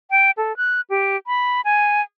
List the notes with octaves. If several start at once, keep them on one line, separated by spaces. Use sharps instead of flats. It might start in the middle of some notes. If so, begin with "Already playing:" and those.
G5
A4
F#6
G4
B5
G#5